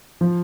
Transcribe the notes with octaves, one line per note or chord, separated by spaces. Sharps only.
F3